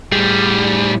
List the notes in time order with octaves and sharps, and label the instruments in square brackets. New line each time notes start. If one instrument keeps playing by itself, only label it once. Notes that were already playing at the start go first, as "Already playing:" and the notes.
[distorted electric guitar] A2 G#4 [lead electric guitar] G3